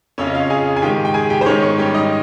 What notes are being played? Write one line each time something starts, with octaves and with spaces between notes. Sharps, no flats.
F2 C#3 C#4 C#5
D#5
F4 F5
G#4 G#5
G#5
G#2 D#3 G4 G5
G5
G#4 G#5
G4 G5
C5
G#2 D#3 C#4 C#5
C#4 C#5
G3 G4
D#4 D#5